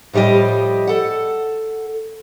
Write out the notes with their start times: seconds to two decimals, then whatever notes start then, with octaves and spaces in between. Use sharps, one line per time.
0.13 A2 F3 G3 G4 D#5
0.87 A4 F#5